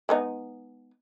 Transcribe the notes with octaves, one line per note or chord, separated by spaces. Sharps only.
G#3 B3 D#4